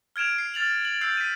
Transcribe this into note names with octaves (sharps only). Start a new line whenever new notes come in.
F6 G#6 D7 E7 F7
C7
F6 A6 F7 F#7
F#7
E6 G6 C7 F#7
B6 D#7